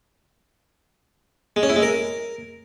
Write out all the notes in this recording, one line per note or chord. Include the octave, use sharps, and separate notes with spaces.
G#3
C#4
E4
G#3
A#4